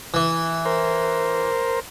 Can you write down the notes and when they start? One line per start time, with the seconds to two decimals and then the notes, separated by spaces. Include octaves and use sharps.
0.14 E3
0.65 A#4 C5